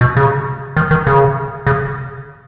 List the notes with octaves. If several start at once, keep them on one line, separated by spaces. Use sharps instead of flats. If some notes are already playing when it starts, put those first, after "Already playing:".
B2
C#3
D#3
D#3
C#3
C#3